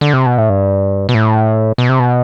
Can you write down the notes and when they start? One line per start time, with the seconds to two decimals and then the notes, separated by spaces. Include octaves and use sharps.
0.01 D3
0.13 C3
0.26 B2
0.38 A2
0.49 G2
1.09 B2
1.15 A2
1.78 B2
1.89 C3
1.99 B2